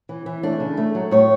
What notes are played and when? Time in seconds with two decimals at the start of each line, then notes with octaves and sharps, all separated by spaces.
0.09 E3
0.26 E3
0.43 A3 D4
0.60 C#3
0.77 A3
0.95 F#3
1.11 A2 C#5